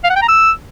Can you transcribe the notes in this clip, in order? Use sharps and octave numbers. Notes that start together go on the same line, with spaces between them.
F5
F#5
G5
A#5
E6